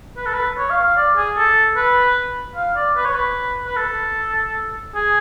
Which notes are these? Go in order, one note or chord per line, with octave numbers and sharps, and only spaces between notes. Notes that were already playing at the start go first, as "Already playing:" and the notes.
B4
A4
B4
C#5
F5
F5
D5
G#4
A4
B4
F5
D5
B4
C#5
B4
B4
A4
G#4